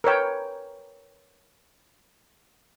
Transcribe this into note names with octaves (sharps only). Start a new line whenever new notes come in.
A#4 B4 C#5 G5